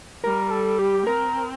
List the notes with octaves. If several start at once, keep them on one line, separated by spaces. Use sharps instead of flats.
G3 A#4
A4
G4
C4 A#4